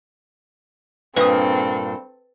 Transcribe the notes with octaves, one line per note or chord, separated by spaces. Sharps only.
G2 A#2 C4 A4 B4 D#6